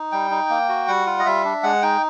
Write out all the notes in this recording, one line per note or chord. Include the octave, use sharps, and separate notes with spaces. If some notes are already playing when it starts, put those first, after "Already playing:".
Already playing: D#4
G3 G5
D#4
A#3
F#4
G3 F#5
F4
D#5
G3 E5
D4
G#3 F#5
D#4 G5